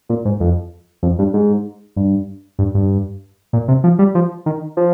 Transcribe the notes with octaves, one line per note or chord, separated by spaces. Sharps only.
A#2
G#2
F2
F2
G2
G#2
G2
G2
G2
A#2
C3
F3
G3
F3
D#3
F3